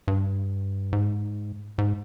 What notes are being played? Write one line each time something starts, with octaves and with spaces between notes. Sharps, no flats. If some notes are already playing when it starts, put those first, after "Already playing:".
G2
G#2
G#2